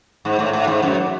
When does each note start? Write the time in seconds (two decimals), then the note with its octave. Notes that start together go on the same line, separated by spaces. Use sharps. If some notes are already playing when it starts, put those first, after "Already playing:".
0.25 G#2
0.39 A2
0.53 A2
0.67 G#2
0.82 F#2